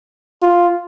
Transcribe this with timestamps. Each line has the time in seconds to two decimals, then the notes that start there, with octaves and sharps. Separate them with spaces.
0.42 F4